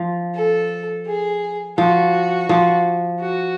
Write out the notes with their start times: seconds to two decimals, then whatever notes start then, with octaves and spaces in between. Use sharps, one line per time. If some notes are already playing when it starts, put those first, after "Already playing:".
Already playing: F3
0.35 A4
1.06 G#4
1.78 F3 F#4
2.49 F3
3.20 F#4